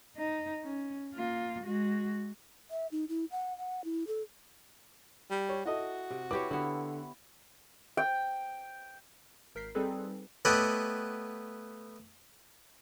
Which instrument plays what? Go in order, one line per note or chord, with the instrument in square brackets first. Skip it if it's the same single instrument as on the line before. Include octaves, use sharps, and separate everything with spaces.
[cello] D#4
C#4
A#3 F4
G#3 F#4
[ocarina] E5
D#4
E4
F#5
F#5
E4
A4
[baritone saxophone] G3
[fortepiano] C#5
[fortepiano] E4 A4 D#5 [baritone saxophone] F#4
[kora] C3
[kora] E4 G4 C#5 [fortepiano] B4 [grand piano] D6
[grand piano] D3 [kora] B3 E4
[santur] G5
[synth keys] G#1 A#4 G6 B6 C7
G3 C4 D#4 G#4 A4 B4
[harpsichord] A3 B3 G4 C#5 D#5 F#5